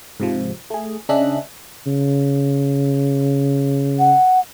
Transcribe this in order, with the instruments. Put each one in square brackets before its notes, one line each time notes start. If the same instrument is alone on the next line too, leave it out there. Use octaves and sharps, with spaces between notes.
[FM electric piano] G#2 C3 F3
A3 G#4
C#3 D4 G#4 D#5 E5 F#6
[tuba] C#3
[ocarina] F#5